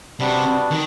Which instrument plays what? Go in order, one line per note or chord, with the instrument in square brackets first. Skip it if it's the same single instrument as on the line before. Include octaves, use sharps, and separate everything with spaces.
[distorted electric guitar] C3 [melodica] G3 B3 D4 F#4
[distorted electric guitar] D#3